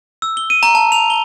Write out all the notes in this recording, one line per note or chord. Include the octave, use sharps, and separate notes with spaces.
E6
G7
D#7
A#5
A5
F7
G7